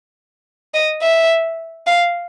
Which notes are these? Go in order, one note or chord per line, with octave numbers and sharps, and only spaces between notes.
D#5
E5
F5